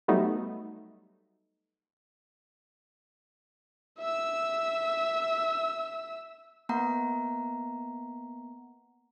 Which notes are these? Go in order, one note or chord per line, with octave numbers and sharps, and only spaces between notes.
F#3 G3 A3 B3 D#4
E5 E6
A#3 B3 F#5 A#5